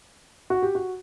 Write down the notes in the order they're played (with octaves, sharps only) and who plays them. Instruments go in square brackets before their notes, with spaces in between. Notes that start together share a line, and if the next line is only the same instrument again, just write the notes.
[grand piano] F#4
G4
F#4